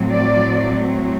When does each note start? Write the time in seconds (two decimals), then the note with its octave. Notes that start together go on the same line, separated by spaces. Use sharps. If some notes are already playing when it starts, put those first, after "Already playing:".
Already playing: A2 F#3 C4
0.12 D5